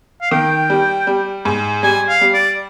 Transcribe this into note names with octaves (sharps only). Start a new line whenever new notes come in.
F5
D#3 G5
G3
G3
G#2
G3 G#5
F5
G3
D5